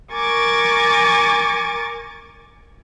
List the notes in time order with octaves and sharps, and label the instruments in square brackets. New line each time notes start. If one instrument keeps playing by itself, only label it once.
[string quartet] A#4 G#5 C#6 D6 A6